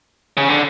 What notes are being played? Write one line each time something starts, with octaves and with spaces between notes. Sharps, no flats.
C#3
D3